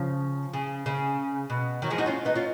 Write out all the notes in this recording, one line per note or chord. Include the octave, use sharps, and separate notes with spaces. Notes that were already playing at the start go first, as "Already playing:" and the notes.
Already playing: C#3 F3
C#3
C#3
B2
D#3 F#3
F3 G#3
D#4 F#4
C#4 F4
B3 D#4
C#4 F4